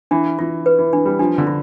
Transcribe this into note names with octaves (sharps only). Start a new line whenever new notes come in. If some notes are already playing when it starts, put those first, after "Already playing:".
E3 D4
E3 F4
B4
E3
E3 D4
G3
F3 D4
D3
F4